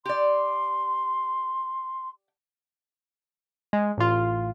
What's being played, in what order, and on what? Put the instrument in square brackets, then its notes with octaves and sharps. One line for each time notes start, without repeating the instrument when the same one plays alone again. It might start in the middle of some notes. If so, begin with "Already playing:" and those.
[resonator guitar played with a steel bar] G4 D5 [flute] C6
[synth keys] G#3
A1 F4